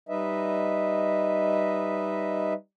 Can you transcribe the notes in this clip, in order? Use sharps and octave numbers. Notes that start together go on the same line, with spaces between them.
G3 D#4 B4 D#5 E5